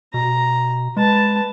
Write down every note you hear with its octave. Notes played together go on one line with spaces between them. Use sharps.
B2 A#5
G#3 B4 A5